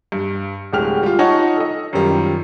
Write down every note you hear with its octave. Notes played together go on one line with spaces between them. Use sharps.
G2
D1 G#3 G4 G5 F6 F7
G3 F4
D#4 F4 C#5 D#5 F#5 A5
A4 D#5
F#2 D#3 F3 G3 F4